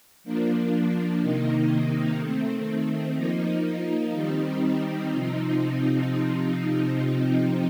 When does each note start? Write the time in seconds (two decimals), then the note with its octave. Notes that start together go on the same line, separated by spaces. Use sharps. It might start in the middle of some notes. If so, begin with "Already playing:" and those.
0.24 F3 A#3 D4
1.21 C3 D#3 A#3 D#4
2.18 D#3 A3 C4
3.16 F3 A#3 D#4
4.12 D#3 G3 C4 D#4
5.09 C3 F3 C4 D#4